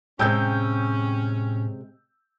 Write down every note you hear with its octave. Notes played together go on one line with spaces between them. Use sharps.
A2 C3 G#3 C#4 G5 E6 G6